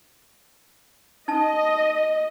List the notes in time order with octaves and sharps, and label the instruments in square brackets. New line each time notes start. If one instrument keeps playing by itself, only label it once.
[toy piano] D#4 A5 [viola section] D#5